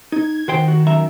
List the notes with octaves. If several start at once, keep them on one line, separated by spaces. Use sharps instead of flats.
D#4 G#6
D#3 F#4 C5 G5
F#4
F#2 E5 A#5